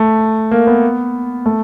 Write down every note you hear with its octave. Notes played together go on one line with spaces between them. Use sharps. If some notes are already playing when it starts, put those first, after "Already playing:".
Already playing: A3
A#3
B3
A3